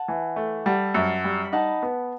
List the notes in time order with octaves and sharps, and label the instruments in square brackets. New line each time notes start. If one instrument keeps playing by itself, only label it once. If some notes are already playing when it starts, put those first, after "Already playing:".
Already playing: [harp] F#5 A5
[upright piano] E3
A3
[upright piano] G3 [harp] F#5 A5
[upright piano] F#2
G3
[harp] B5
[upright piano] D#4 [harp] F#5 A5
[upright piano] B3